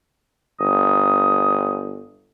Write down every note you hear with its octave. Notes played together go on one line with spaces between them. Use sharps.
G1 D#6